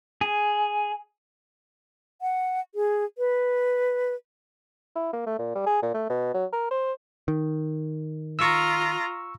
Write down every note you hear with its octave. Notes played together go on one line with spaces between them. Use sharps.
G#4
F#5
G#4
B4
E4
A#3
A3
A#2
G3
G#4
A#2
A3
B2
F#3
A#4
C5
D#3
F4 A#5 C#6 E6